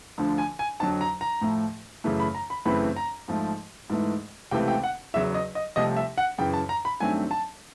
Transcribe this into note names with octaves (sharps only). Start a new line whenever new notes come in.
D2 D3 F3
G#5
G#5
F2 D3 F#3 A5
A#5
A#5
A2 F3 A3
F#2 C#3 E3 A3
B5
A#5
B5
F#2 C#3 E3 A3 C4 B5
A#5
G#2 F3 A3
G#2 E3 A3
C#2 C3 E3 A3 C4 G5
G5
F#5
E2 C#3 F#3 E5
D#5
D#5
C2 C3 F3 A3 D#5
E5
F#5
F#2 C#3 E3 G5
A5
A#5
B5
G2 D#3 F#3 A3 C4 G#5
A5